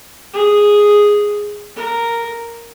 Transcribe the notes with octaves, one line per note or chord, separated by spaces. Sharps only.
G#4
A#4